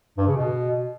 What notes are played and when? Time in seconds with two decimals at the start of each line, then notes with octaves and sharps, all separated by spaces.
0.18 G2
0.27 C#3
0.36 B2